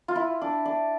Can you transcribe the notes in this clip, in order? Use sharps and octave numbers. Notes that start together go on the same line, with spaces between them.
F4
E4
D4
D4